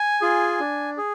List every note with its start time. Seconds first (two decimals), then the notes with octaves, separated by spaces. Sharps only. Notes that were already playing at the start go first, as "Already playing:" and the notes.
Already playing: G#5
0.21 F4 G#4
0.60 D4
0.98 G#4